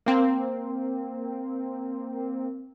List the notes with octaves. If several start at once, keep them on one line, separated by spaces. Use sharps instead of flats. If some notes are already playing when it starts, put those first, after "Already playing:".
A#3 C4